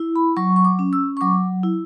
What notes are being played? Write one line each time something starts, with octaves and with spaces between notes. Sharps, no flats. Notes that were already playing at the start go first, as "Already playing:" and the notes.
Already playing: E4
B5
F#3 C#6
C#6
D6
C#4
E6
C#6
F#3 D6
E4